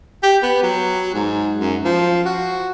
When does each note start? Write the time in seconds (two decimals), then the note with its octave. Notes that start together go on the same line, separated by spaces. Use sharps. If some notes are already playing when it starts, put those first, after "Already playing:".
0.23 G4
0.43 B3
0.63 F#3
1.14 G#2
1.60 F#2
1.85 F3
2.25 F#4